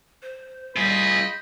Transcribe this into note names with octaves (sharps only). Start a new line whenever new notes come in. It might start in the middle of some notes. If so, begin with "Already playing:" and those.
C5
G3 F4 G#4 C5 D#5 B5